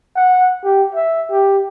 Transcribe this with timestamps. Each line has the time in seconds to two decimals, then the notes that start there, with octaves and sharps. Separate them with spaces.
0.15 F#5
0.63 G4
0.94 E5
1.30 G4